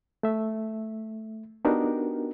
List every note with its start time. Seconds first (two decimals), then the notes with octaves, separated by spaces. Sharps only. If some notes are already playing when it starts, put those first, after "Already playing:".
0.23 A3 E5
1.65 B3 D4 D#4 F#4 G4 A#4